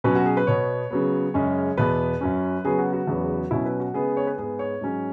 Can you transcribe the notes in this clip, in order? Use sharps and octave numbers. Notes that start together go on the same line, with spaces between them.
B2 F#3 C#4 B4
F#4
G#4
B4
B2 B3 C#5
C#3 F#3 B3
F#2 C#3 G#3 C#4
E2 B2 B3 B4
F#2 F#3 C#4
C#3 F#3 B3 G#4
F#4
F#4
E2 C#3 F#3 B3
B2 F#3 C#4 E4
B4
F#4
C#3 G#3 B3 G#4
C#5
B4
G#2 G#3 B3 G#4
C#5
G#2 F#3 C#4